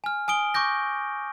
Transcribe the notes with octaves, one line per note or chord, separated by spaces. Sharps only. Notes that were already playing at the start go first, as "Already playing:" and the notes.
G#5 F6
G#5 D#6 D7 G7
C#6 D6 G6 A#6